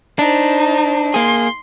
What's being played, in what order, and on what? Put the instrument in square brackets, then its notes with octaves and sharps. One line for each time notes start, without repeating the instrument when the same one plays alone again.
[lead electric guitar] D4 [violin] D#4 C5
[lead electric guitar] A#3 G#4 [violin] C6